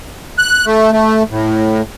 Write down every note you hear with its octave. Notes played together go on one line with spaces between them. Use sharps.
F#6
A3
A3
A2